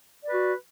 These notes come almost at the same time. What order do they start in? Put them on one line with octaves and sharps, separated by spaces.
D5 B4 F#4